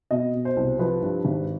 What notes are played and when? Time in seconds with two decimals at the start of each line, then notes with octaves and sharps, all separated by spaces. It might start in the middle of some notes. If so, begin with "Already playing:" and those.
0.11 B2 D#5
0.34 B2
0.45 C5
0.56 C2
0.79 F3 B4
1.02 G2
1.25 G#1